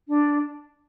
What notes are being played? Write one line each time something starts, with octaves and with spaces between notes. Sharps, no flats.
D4